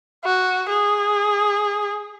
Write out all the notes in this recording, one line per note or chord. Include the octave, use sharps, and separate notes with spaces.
F#4
G#4